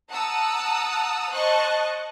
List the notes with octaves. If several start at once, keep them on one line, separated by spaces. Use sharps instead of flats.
F#5 A5 A#5 D#6 E6
C5 D#5 A5 C#6 F#6